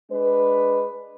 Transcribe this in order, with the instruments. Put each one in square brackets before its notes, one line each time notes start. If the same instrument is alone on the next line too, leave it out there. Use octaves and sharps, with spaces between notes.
[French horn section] G#3 D4 B4